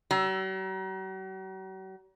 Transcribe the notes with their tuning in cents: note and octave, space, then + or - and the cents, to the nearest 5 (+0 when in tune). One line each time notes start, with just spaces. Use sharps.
F#3 +45